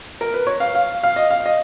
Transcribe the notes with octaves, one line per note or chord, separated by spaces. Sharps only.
A#4
B4
C#5
F5
F5
F5
D#5
F5
D#5